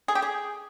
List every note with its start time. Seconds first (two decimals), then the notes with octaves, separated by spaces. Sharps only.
0.08 G#4
0.15 G4
0.22 G#4